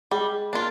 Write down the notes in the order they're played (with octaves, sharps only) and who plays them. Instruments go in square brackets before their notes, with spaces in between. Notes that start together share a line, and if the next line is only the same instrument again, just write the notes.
[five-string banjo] G3 [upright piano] G#3
[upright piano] A#3 [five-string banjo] D4 F4